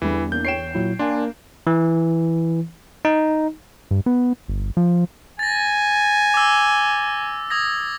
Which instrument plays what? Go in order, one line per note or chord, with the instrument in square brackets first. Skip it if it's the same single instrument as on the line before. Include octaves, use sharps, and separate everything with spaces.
[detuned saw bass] E2 [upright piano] D3 G3 [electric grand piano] E3
[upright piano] A#3 D4 [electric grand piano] G6
[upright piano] C#5 G5 [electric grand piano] C7 D7 E7
[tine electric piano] A#2 F#3 E4
[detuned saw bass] A#3 [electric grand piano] D4 [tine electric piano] G#5 C6
[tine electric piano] E3
D#4
[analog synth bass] G2
B3
G1
F3
[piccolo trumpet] G#5 [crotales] A6 A#6
[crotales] D6 E6
D#6 G#6 A#6